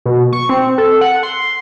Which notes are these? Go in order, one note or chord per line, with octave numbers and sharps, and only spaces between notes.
B2
C#6
C4
A4
F#5
C6